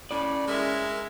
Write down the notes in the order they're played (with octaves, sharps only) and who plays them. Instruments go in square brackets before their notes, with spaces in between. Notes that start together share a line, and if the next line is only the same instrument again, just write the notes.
[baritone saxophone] A2 [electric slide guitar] C#4 D5 [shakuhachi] B5
[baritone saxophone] G#3 [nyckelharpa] E4 E5 [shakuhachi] A#4